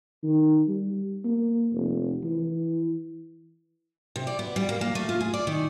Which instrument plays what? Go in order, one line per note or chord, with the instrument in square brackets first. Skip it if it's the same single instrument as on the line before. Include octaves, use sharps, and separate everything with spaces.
[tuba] D#3
G3
A#3
F1
E3
[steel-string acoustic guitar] C3
D5
B3
G3
A#3
A#3
A3
F4
G#4
D5
D#3